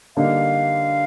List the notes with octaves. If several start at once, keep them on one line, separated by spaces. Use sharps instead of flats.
D3 G3 A#3 D#4 F5